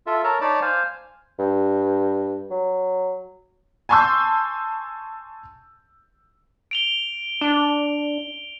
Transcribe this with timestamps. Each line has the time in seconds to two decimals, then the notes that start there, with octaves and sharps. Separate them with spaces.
0.07 F4 A4 E5
0.24 A#4 C#5 A5 A#5
0.41 D#4 C#5 D5 A5 B5 D6
0.62 C5 F5 G#5
1.39 G2
2.51 F#3
3.89 G#5 A5 C6 C#6 E6 G6
6.71 D7 F7 G7
7.41 D4